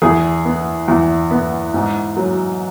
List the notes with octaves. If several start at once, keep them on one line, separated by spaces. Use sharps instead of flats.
E2 G#4
B3
E2
B3
G#2
F#3